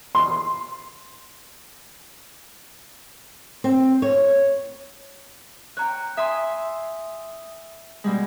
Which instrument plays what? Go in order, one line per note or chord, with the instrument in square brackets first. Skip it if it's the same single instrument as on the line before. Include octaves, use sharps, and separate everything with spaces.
[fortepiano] C6
[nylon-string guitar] C4
C#5
[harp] C#5 G5 [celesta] A#5 F#6
[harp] E5 G#5 C6 [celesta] D#6
[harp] B2 G3 G#3